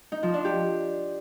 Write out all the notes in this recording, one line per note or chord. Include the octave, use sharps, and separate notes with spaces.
D#4
F3
D4
G4